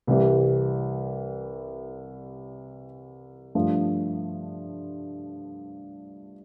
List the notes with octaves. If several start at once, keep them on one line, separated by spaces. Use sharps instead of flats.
C2 C3 E3 G3
G2 F3 A3